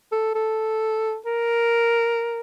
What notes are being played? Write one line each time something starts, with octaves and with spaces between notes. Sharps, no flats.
A4
A4
A#4